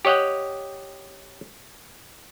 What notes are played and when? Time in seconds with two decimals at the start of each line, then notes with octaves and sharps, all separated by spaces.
0.05 G4 C#5 D#5 F#5 G5